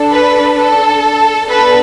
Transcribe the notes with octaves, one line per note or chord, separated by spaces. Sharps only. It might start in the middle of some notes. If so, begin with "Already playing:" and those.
Already playing: D4 A4
B4
A4
B3 D4 A4 B4